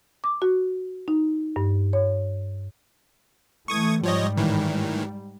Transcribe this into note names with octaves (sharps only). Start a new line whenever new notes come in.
D6
F#4
D#4
G2
C#5
E3 A3 C#6 D#6 G#6
G#2 F3 G3 C#5 D#5
A2 D#3 E3